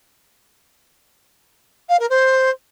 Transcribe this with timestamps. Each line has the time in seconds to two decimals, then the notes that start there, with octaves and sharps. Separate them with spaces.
1.89 F5
2.00 A#4
2.10 C5